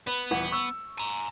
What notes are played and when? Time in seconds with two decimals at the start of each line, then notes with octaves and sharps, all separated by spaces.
0.07 B3 B4
0.31 D#1 E3 F#5
0.52 C#6 E6
0.98 G#5 A#5